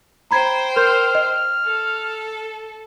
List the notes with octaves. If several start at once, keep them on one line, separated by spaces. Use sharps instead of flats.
C5 G5 A#5 B5 G#6
A#4 C6 F6 G6
D#5
A4